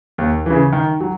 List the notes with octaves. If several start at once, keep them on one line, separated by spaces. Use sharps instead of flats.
D#2
C#3 E3
D#3
F#3